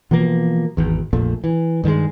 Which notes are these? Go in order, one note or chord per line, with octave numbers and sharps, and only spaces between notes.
B2 E3 F3 A#3
G#1 E2
A#1 F2 A#2 A3
E3
G2 D#3 F#3 G#3